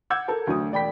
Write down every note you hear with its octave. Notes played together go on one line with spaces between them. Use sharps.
F#5 D6 E6 G6 G#6
A4 A#4 A5
D2 F#3 D#6
E1 D5 G5 B5 B6